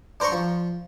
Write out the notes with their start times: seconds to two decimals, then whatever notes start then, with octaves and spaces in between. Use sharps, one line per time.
0.20 D4 C5 A#5 C6 C#6
0.32 F3